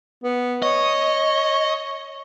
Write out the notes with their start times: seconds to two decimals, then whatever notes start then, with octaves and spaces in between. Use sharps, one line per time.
0.24 B3
0.62 C#5 D#5